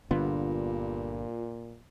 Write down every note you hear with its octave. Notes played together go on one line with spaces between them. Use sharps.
G1 G2 A#2 D3 B3 F4